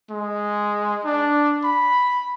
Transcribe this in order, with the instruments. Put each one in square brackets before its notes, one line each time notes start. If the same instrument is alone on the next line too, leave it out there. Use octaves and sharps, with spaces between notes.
[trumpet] G#3
D4
B5